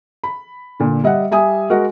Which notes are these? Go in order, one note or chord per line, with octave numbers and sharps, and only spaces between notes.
B5
A#2 D3
G3 D#5 E5 F#5
G3 E5 G#5 D#6
G#3 F#4 A#4 D#5 F#5